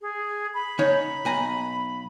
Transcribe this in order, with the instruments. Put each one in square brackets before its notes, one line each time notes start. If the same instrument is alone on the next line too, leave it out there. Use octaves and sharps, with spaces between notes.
[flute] G#4
B5
[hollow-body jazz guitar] C#3 D#4 C#5
B1 G#5 A#5